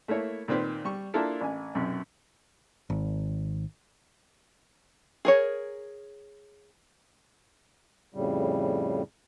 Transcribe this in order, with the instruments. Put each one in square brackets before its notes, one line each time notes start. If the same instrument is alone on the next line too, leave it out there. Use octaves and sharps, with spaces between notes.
[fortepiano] A3 A#3 E4 C#5
A#2 D#3 C4 B4 C5
G3 C#6
A#3 D4 E4 F4 A4 A#4
A1 G#5
B1 F#2 C3
[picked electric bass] G#1
[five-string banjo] G#4 A#4 C#5
[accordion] F2 A2 C#3 G3